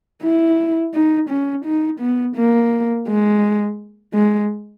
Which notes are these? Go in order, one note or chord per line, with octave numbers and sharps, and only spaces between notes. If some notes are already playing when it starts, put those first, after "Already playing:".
E4
D#4
C#4
D#4
B3
A#3
G#3
G#3